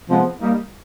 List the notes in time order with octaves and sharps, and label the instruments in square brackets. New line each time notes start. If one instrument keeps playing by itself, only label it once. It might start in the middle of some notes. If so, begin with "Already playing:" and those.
[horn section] C3 F3 G#3 B3
G3 A#3 D#4